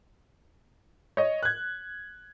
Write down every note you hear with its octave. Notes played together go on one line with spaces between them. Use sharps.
C#5 D#5
F#6 G#6